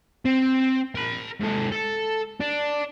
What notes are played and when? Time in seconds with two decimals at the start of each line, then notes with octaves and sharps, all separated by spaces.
0.25 C4
0.95 A#4 B5
1.41 G#2 A4
1.72 A4
2.41 D4